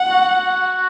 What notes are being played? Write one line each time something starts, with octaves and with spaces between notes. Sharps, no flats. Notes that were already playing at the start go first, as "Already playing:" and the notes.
Already playing: F#5
F#4